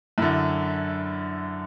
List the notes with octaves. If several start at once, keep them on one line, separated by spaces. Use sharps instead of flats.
F#2 D3 E4